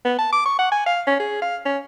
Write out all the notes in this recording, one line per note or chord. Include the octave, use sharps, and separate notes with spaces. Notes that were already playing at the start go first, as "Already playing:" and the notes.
B3
A5
D6
C#6
F#5
G#5
F5
C#4
G#4
F5
C#4